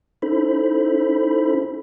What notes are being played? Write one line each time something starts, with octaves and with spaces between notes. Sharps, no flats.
C#4 D#4 E4 A4 C5 B5